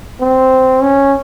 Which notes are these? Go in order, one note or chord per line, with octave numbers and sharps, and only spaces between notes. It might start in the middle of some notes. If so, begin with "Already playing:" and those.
C4
C#4